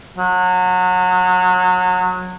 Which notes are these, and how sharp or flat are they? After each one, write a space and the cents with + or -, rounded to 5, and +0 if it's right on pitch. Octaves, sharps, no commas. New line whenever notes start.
F#3 -25